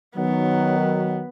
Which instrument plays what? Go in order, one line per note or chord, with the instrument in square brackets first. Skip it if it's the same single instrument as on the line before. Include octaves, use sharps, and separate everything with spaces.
[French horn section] D#3 F#3 [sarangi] B3